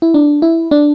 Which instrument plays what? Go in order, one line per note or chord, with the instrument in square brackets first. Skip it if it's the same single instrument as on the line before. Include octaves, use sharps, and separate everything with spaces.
[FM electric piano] E4
D4
E4
D4